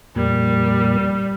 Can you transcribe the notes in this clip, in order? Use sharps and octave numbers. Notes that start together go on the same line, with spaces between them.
F2 A#2 G3 A#3